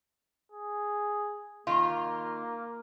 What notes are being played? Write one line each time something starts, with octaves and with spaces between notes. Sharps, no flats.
G#4
D#3 A#3 F4